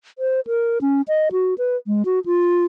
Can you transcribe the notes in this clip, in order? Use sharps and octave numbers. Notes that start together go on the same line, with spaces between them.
C5
A#4
C#4
D#5
F#4
B4
G#3
F#4
F4